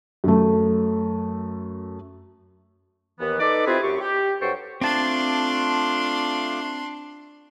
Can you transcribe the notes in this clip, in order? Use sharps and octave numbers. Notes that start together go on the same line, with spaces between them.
F#2 A3
D#2 E3 B3
D#4 A4 B4 D5
C4 E4 F4 G4 G#4 B4
F#2 G4 C#6
G4
G2 F#3 A4 C5 G5 C#6
A3 C4 D4 F4 A5 C6 D6